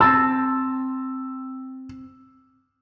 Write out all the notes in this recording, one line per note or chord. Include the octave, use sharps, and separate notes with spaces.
C4 A5 E6